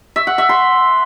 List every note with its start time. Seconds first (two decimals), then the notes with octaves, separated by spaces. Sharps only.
0.16 E5
0.27 F#5
0.38 E5
0.49 C6